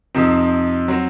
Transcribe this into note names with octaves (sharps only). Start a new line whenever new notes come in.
F2 C3 F3 C4 D#4
F#3 C4